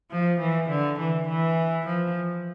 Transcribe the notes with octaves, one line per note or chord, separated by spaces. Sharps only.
F3
E3
D3
E3
E3
F3